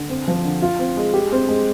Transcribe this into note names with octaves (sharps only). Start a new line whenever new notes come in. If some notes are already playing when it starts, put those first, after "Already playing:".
Already playing: D3
C4
F3
D3
F4
C4
G#3
G4
C4
G#3